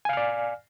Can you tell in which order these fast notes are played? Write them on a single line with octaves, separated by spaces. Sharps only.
G#5 F5 F6 D5